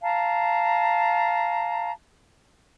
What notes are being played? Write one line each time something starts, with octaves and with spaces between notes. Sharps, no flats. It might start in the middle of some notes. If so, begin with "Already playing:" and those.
F5 A5 A#5